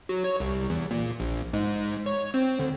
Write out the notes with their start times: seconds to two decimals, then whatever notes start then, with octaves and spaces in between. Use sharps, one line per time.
0.09 F#3
0.24 C#5
0.40 C2
0.70 E2
0.91 A#2
1.20 A#1
1.53 G#2
2.06 C#5
2.34 C4
2.59 D2